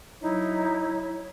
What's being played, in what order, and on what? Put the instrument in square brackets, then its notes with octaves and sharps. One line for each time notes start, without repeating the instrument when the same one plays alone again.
[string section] F#3 [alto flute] D#4 [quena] E4 [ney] C#5